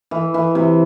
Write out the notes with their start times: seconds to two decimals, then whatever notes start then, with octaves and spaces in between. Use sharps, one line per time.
0.11 E3
0.34 E3
0.55 C3